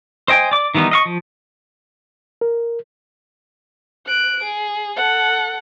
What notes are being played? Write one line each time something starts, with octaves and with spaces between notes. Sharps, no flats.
C5 D#5 G5 G#5
D5 D6
D#3 E3 G3 B3 D#4
D#5 F5 C#6
F3
A#4
F#6 D7
G#4
A4 F#5